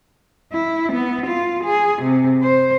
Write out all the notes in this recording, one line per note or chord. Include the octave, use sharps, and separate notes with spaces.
E4
B3
F4
G#4
C3
C5